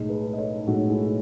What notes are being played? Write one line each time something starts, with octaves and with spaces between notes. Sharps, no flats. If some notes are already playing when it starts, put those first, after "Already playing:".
Already playing: B1 A2 G#3 D#5
G#4 B4
D#5
A4 C#5
B1 A2 G#3 F#4 A4
E4 G#4